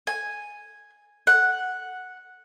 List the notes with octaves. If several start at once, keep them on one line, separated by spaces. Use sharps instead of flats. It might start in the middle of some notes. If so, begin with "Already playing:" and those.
G#5
F#5